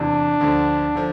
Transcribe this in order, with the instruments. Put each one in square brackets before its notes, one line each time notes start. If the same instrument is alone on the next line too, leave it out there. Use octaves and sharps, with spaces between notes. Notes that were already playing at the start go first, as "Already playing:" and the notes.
Already playing: [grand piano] E2 C3 E3 [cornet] D4
[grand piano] D2 D3 F3
D3 F3